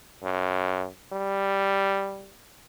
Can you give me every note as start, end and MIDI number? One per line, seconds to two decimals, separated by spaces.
0.23 0.87 42
1.13 2.34 55